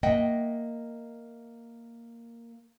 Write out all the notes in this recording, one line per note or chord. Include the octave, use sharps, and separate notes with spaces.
A#3 D#5 E5 F#5 G5